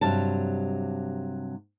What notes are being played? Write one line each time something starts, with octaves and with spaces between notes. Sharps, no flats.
G2 C3 F#3 A5